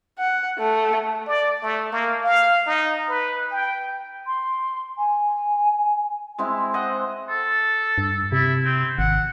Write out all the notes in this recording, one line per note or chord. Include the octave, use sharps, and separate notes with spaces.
F#5
A3
D5
A3
A#3
F5
D#4
B4
G5
C6
G#5
G#3 C4 E4
C5 D#5 F#5
A4
G2
C3 E4
C4
G#1 F#5